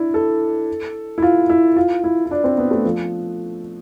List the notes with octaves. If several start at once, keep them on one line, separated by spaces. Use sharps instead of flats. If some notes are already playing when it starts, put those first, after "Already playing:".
Already playing: D4 E4
A4
E4
F4
E4
F4
E4
E4
D4
C4
B3
A3
F3